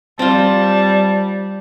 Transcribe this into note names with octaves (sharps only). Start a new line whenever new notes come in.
G3 C4 F4 A5